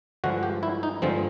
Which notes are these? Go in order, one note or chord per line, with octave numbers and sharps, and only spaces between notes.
G2 D3 F3 G#3 F#4
G4
E4
D#4
G2 D3 F3 G#3 C4